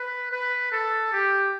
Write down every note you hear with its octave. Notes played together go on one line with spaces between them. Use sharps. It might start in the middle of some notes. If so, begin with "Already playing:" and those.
Already playing: B4
B4
A4
G4